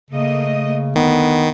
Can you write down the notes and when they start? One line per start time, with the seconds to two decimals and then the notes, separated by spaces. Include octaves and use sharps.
0.11 C#3 A3 A#3 D#5
0.96 D3 D#3 B3